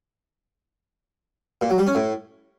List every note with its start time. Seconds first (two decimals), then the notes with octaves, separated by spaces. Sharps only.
1.61 A#2
1.70 F#3
1.78 G3
1.87 C#4
1.95 A2